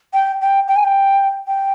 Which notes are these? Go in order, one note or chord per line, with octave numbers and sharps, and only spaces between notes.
G5
G5
G5
G#5
G5
G5